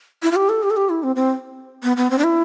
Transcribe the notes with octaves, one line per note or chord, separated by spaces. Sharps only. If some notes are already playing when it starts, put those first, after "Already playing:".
E4
F4
G4
A4
G4
A4
G4
E4
C4
C4
B3
B3
C4
D4
E4